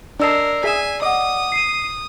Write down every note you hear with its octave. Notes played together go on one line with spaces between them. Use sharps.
D4 A#4 D5 D#5 A5 E6 C7
G#4 E5 G#5 B6 E7
D#5 F#5 D6 D#6
C7 D#7